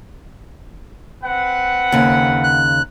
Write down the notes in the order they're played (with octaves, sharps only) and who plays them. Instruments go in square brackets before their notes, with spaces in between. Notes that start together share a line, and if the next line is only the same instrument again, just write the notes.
[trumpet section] C4 B4 F#5
[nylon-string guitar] D#2 C#3
[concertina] F#6